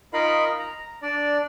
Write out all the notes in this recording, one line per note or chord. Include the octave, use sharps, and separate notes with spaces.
D#4 F4 A#4 D#5 F5 B5
A#5
D4 D5